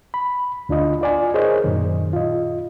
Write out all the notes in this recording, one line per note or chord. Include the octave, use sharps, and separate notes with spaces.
B5
D2 D4 F4 D#5
F4 D5 G#5
G#4 A#4 C5 C#5 D#5
F#2 A#2 D#3
F4 D#5